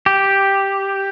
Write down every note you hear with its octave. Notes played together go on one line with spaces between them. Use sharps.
G4